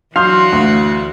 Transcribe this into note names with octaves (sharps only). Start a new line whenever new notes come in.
E3 F#3 D4 F#4 F5 C6 D#6 G6
D2